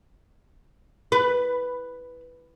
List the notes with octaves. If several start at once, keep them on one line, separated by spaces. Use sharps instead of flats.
B4